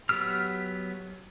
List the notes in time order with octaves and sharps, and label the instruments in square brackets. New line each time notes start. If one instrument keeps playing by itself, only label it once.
[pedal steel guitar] F#3 B3 G4 E6 F6